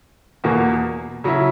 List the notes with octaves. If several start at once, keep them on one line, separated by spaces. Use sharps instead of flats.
E2 B2 A#3
C#3 F#3 C#4 E4